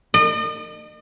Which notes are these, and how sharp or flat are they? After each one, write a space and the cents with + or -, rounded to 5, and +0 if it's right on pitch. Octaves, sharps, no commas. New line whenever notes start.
D#5 -40